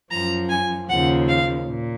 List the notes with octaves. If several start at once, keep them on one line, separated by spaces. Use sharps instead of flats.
F#2 F3 A#5
G#5
D#2 C#3 F3 F#5
F5
A#2